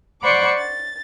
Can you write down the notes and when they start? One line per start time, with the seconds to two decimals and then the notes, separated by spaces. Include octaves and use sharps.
0.22 C5 D5 F#5 B5 C#6 D6
0.57 A6